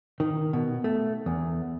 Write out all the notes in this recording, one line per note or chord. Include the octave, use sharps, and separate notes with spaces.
D#3
B2
A3
E2